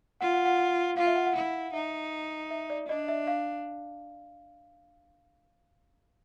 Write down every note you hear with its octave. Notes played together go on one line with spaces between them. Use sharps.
F4 F#5
F#5
F#5
F#5
F4 F5
E5
F#5
F#5
E4
D#4 E5
E5
D5
D4 D#5
E5
F5